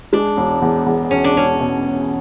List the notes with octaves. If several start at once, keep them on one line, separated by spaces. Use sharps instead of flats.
G#3 D4
E1
E2
E2
E1 C#4
D4
E1 C#4
B2